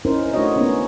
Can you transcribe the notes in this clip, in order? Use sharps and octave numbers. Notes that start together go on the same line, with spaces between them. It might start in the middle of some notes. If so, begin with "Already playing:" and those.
C#4 D#4 E4 A#4 C5
A3 D4 D#4 F#4 C#5 D#5
A#3 B3 C#4 D#4